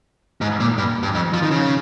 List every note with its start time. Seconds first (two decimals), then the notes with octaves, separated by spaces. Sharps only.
0.41 G#2
0.60 A#2
0.78 G2
1.03 G2
1.14 F2
1.34 F3
1.43 D#3
1.51 C#3